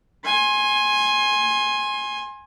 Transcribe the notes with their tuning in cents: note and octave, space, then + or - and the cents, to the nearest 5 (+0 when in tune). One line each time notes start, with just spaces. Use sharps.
G#5 +0 C6 +30